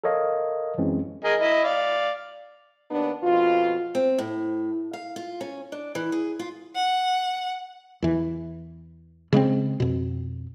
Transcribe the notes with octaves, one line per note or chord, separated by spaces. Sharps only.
A4 A#4 C#5 D#5 F5
F#2 E3 G#3 C4 C#4
G#4 A#4 D#5
E4 D#5
D5 F5
D#2 B3 D4
F2 B2 F4
C4
A2
F5
F4
C#4
D4
E3
G#4
F4
F#5
E2 E3
C#3 G#3 B3 C4
F2 B2